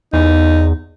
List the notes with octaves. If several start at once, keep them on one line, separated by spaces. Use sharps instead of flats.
E2 D#4